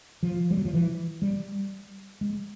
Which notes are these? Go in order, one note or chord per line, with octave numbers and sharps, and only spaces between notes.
F3
G3
F#3
F3
E3
G3
G#3